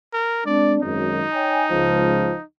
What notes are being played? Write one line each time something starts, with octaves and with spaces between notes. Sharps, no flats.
A#4
G#3 C4 D4 D5
G#1 F#2 D#4
C#5 G5 G#5
C#2 F3